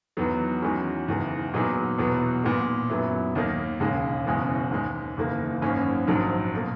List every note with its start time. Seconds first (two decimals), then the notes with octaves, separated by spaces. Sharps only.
0.17 E2 D#3 F#3 B3
0.62 E2 D#3 G#3 C#4 F#4
1.07 F#1 E2 D#3 G#3
1.54 A#2 F#3 B3 D#4 G#4
1.98 E2 B2 F#3 B3
2.43 A#2 G#3 B3 D#4
2.90 F#2 D#3 F#3 B3 E4
3.35 D#2 D#3 A#3 D#4
3.80 E1 D#2 C#3 G#3
4.26 F#1 E2 B2 G#3 C#4
4.71 D#2 D#3 G#3
5.17 F#1 E2 D#3 A#3
5.61 G#1 F#2 D#3 A#3 C#4
6.07 A#1 G#2 D#3 F#3
6.54 B2 A#3